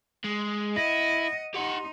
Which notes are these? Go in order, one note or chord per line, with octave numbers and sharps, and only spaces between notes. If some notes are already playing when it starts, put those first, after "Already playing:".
G#3
E4 D#5 F#5 A#6
D#4 G4 F#5 C6